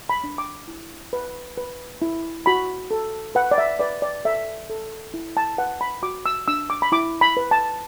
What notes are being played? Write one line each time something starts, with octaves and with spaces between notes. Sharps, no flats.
B5
D4
D6
E4
B4
B4
E4
F#4 B5
A4
B4 F#5
D5
E5
B4 D5
D5
A4 E5
A4
E4
A5
B4 F#5
B5
F#4 D6
E6
D4 E6
D6
B5
E4 D6
B5
B4
A5